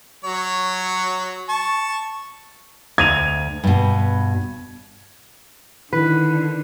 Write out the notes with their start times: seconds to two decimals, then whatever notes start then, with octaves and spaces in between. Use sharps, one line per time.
0.24 F#3 C#5
1.49 A5 C#6
2.98 D2 G#6 D#7 F7
3.64 G2 B2
5.93 D3 D#3 E4 B4